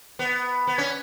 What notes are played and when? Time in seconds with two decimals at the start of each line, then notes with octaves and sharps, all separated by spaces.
0.19 B3
0.67 B3
0.78 C#4